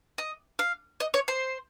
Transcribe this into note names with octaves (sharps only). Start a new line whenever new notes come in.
D#5
F5
D#5
C#5
C5